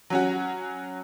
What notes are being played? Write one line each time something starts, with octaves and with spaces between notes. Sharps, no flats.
F#3 C#4 F#4